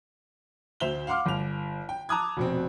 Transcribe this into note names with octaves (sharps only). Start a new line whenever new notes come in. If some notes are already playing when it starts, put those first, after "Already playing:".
D2 C5 E5 E7 F7 G7
F5 F#5 C6 D6 F6
G1 F7
G5
A5 A#5 D6 D#6 F#6 G#6
F1 B2 C4